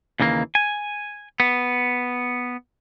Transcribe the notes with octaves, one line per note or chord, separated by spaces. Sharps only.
D#2 C#3 E3 A#3
G#5
B3